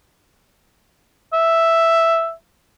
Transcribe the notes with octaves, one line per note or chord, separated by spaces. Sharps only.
E5